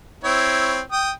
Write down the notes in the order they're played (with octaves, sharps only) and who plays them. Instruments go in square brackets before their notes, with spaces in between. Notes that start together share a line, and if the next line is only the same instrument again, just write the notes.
[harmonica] C4 E4 C#5
G5 D#6